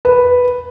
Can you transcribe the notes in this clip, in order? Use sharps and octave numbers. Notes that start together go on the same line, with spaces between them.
B4